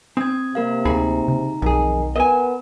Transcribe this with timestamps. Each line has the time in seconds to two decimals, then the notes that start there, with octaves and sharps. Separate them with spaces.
0.17 C4 D#6 G#6
0.55 C3 A#3 A#4 F5
0.85 D2 A#3 D#4 G#4 A#5 B5
1.28 C#3
1.62 B1 F2 D#3 G#4
2.16 B3 A#4 D#5 G#5